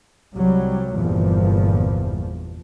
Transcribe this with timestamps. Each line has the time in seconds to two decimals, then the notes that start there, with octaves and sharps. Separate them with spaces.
0.34 C2 F#3 G3
0.96 G1 E2 G2 A#2 F3